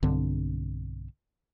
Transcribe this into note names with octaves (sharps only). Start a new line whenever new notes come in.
B1 G2 D3 C4